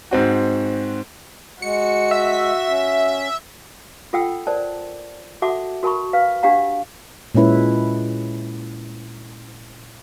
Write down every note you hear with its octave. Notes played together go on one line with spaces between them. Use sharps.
G#2 C4 F#4
G#3 F#4 C#7
E5
C#4
F4 A4 F#5 G5 E6
A#4 C5 D5 A5
F#4 A4 E5 F#5 A5 D6
F#4 A#4 A5 B5 C#6
B4 F5
D4 G4 F5 F#5 A#5
A#2 G#3 C#4 E4 B4